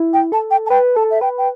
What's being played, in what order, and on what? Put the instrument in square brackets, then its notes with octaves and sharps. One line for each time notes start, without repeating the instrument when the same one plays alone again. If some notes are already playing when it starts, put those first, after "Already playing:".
Already playing: [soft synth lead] E4
[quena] G5
[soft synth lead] A4 [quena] A5
[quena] G5
A5
[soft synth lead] B4 [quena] G5
[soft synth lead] A4 [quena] A5
[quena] E5
[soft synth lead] B4 [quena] G5
[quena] G5